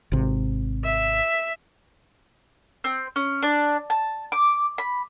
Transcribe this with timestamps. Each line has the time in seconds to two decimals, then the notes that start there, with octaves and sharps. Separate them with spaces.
0.12 G#1 C3
0.85 E5
2.84 C4
3.16 C#4
3.42 D4
3.90 A5
4.32 D6
4.78 B5